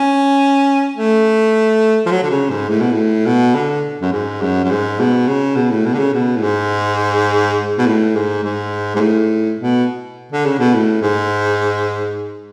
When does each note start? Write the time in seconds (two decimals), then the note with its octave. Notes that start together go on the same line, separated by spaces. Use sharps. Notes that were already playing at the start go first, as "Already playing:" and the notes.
Already playing: C#4
0.97 A3
2.06 F3
2.11 F#3
2.23 D3
2.31 C#3
2.50 G#2
2.69 A2
2.80 B2
2.91 A2
3.26 B2
3.55 D3
4.02 F#2
4.12 G#2
4.41 F#2
4.64 F#2
4.71 G#2
4.99 B2
5.28 C#3
5.56 B2
5.71 A2
5.85 B2
5.94 D3
5.99 C#3
6.14 B2
6.36 A2
6.42 G#2
7.78 B2
7.86 A2
8.15 G#2
8.44 G#2
8.96 G#2
9.00 A2
9.59 B2
10.32 D3
10.45 C#3
10.59 B2
10.74 A2
11.02 G#2